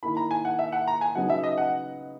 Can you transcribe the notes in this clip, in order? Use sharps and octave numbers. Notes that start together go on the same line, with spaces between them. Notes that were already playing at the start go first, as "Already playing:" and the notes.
D#3 A#3 E4 B5
A#5
G#5
F#5
E5
F#5
A#5
G#5
C#3 F#3 B3 D#4 F#5
E5
D#5
F#5